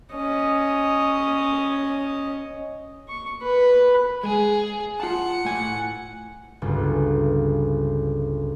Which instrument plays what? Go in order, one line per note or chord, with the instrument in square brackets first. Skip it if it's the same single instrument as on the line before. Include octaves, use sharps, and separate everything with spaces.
[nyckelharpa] C#4 D#5
C#6
B4
[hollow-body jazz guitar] G#3 [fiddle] G#4
[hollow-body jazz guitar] F4 A5 [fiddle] F#5
[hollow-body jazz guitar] A2 G#5
[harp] G1 C#2 F#4